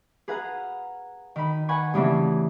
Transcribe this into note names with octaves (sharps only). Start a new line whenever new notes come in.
G#4 B4 F5 F#5 A#5
D#3 B5
B4 F#5 G#5 B5 C#6
G2 C#3 E3 A3 C4